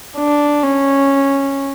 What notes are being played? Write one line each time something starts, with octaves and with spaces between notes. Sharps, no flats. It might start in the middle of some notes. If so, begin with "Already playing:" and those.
D4
C#4